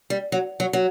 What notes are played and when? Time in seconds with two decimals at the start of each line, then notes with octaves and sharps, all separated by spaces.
0.10 G3
0.32 F#3
0.60 F#3
0.73 F#3